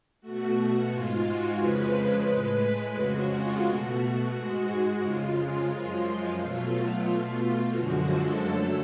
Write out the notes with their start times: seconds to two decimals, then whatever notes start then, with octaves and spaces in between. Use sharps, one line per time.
0.21 B2 A3 F#4
0.55 F#4
0.90 G#2 G#3 F4
1.24 F#4
1.57 F2 C#3 F3 G#3 B4
2.27 A2 G#3
2.94 F2 C#3 G#3 F#4
3.29 F4
3.63 B2 A3 F#4
4.32 G#2 G#3
4.99 F2 C#3 G#3 F4
5.68 F#2 F3 G#3
6.37 B2 F#3 A3
7.05 B2 A3
7.73 F#2 D3 F3 G#3 F#4
8.08 A4
8.42 F#2 D3 F#3 A3 A4